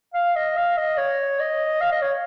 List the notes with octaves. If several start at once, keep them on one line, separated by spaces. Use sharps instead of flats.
F5
D#5
F5
D#5
C#5
D#5
F5
D#5
C#5